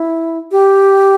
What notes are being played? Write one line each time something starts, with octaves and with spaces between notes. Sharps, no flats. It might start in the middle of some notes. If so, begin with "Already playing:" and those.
Already playing: E4
G4